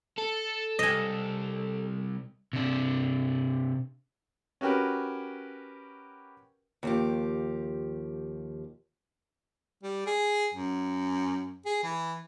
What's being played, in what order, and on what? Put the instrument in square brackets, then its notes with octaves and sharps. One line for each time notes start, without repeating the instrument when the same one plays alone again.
[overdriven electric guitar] A4
[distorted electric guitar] C2 [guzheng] D#5 G#5
[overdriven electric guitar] C3 D4
[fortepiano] C#4 F#4 G4 A#4 B4
[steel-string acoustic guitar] D#2 F3 G4
[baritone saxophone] G3
G#4
F#2
G#4
E3